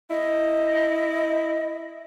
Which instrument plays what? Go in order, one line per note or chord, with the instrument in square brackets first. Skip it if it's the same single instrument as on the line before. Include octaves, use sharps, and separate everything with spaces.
[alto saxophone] E4 [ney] D#5